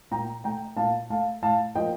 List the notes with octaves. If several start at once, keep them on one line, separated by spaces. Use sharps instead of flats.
A#2 G5 A#5
A3 G5 A#5
A#2 F5 A5
A3 F5 A5
A2 F5 A5
F3 A#3 D#5 G5